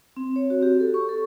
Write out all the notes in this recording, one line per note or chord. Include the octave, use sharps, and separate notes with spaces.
C4
C#5
F#4
G4
A4
C#6
A4